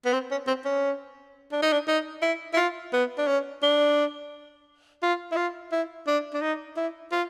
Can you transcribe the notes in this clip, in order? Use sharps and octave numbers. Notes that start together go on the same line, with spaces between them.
B3
C4
C#4
C4
C#4
D4
D#4
D4
D#4
E4
E4
F4
B3
D4
C#4
D4
F4
E4
F4
E4
D4
D4
D#4
E4
F4